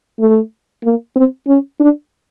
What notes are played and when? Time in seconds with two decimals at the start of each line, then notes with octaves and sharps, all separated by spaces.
0.20 A3
0.84 A#3
1.16 C4
1.47 C#4
1.80 D4